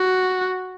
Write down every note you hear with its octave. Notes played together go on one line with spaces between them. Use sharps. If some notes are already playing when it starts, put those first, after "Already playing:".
Already playing: F#4